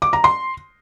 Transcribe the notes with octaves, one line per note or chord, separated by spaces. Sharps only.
D6
A#5
C6